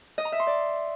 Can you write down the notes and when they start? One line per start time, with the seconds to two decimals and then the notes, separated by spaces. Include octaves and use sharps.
0.18 D#5
0.25 A#5
0.32 E5
0.40 C6
0.47 D5